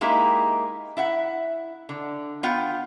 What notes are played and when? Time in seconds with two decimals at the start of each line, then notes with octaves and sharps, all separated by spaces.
0.01 G#3 A#3 D#4 E4 G4
0.97 E4 E5 F#5
1.89 D3
2.43 B3 F4 F#5 G5